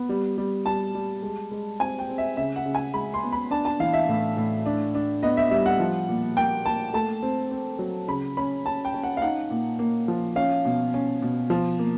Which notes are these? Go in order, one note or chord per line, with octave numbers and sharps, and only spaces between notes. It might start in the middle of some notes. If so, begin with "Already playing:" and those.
Already playing: B3
G3
G3
G3 A5
G3
G#3
G#3
C4 G#5
G5
C4
E5
C#3 E5
F#5
C#3
G#5
G#3 B5
C6
B3
B5
D4 A5
A5
E3 F5
E5
A2
A2
D4
D4
B3 D#5
E5
G3 E5
F#5
F3
A#2
A#3 G5
A#3 A5
A3 A5
C4
C4
F#3
C#3 B5
C#4 B5
C#4 A5
G5
C#4
F#5
F5
D#4 F#5
A#2
A#3
F3
C#4 F5
B2
C#4
B2
F3
A#3